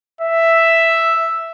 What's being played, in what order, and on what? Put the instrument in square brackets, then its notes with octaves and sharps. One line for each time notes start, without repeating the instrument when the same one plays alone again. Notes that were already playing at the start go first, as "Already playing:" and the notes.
[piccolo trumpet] E5